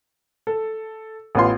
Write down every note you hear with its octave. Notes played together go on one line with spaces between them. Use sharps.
A4
A1 B3 F4 C6